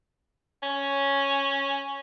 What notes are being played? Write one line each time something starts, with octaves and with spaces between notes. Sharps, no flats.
C#4